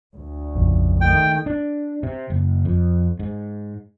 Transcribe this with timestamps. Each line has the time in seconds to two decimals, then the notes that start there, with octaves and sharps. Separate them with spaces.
0.15 D2
0.55 A#1 F2 C#3
1.01 D#3 A3 G5
1.46 D4
2.03 C3
2.30 F#1
2.65 F2
3.19 G#2